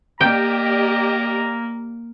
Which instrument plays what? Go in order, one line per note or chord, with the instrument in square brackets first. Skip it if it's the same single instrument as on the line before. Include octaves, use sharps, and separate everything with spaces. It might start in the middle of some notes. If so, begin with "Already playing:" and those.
[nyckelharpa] A#3 [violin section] G4 D5 D#5 [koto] G5 [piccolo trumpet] A#5